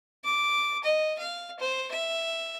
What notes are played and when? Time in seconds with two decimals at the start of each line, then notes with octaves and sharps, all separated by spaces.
0.24 D6
0.84 D#5
1.18 F5
1.59 C5
1.91 E5